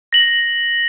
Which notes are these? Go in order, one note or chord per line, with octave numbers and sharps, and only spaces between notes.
A#6 F#7